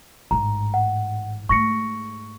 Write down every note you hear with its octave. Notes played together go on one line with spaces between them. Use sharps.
A1 G#2 A#5
F#5
G#2 A3 C#6 A#6 C#7